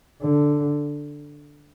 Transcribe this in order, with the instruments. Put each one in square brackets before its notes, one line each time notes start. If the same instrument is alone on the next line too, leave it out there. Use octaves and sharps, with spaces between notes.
[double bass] D3